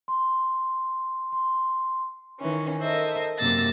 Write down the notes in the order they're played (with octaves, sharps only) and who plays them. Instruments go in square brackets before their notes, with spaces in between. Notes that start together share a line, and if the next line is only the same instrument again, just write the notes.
[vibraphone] C6
C6
[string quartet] D#3 E3 C#4
A4 A#4 C5 D#5 E5
F#2 C3 A#3 E6 A6 A#6